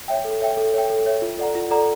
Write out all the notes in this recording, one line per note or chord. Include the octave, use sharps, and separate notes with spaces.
C#5 E5 G5
A4
C#5 E5 G5
A4
C#5 E5 G5
A4
C#5 E5 G5
F4
A4 D5 F#5 A#5
F4
A4 D5 F#5 A#5